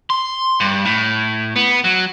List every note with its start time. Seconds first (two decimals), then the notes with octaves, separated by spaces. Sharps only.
0.10 C6
0.60 G2
0.85 A2
1.56 B3
1.84 F#3